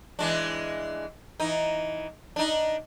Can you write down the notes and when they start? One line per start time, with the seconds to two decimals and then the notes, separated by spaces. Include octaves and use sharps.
0.19 E3 G#3 D4
1.40 E3 D#4
2.36 D4 D#4